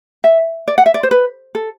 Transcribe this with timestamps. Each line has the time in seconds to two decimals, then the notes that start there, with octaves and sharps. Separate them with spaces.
0.24 E5
0.68 D5
0.78 F#5
0.86 E5
0.94 D5
1.03 C5
1.11 B4
1.55 A4